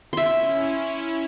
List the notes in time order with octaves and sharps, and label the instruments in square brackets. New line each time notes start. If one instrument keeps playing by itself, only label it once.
[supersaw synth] C#4 E4 [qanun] E5 C6